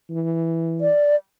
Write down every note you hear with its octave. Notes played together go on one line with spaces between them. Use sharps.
E3
D5